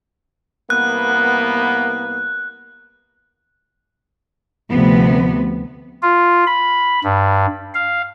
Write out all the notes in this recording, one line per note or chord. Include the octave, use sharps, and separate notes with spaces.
C2 A#3 B3 F#6
D2 C3 F3 B3
F4
B5
G2
F5